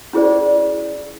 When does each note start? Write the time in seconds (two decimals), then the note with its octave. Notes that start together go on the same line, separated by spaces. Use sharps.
0.13 C#4 E4 G#4 C5 D5